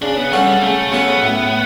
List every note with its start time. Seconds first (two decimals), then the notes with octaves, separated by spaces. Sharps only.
0.02 C#3 D4
0.17 B3
0.32 F#3 G3 C#4 F#4 A4
0.47 G3
0.62 C#3 A3
0.92 F#3 B3 C#4 F#4 A4
1.22 A2